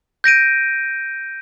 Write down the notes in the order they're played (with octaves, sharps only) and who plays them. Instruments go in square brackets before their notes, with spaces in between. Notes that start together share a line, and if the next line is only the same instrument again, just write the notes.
[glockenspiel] G6 A#6 D7 D#7